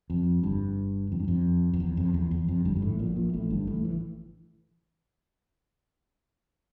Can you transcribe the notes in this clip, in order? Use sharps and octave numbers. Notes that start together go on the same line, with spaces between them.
F2
G1 G2
F2
G2
F2
F2
E2
F2
E2
E2
F2
G1 G2
G2
A1 A2
A#1 A#2
A#1 A#2
A1 A2
G1 G2
A1 A2
E3